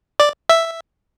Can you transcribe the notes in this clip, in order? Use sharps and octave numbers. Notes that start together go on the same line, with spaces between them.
D5
E5